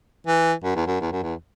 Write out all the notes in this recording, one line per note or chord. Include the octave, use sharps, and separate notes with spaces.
E3
F#2
E2
F#2
E2
F#2
E2